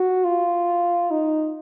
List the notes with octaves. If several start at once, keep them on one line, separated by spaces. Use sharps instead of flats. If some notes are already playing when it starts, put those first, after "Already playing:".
Already playing: F#4
F4
D#4